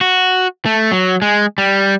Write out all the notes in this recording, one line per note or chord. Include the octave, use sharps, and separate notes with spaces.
F#4
A3
F#3
G#3
G3